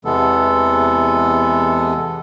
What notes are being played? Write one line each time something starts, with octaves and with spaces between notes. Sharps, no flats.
E2 C3 E3 G#3 B3 A4